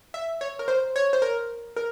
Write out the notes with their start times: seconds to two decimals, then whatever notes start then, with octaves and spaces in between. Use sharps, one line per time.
0.14 E5
0.41 C#5
0.59 A#4
0.68 C5
0.96 C#5
1.13 C5
1.22 A#4
1.76 A#4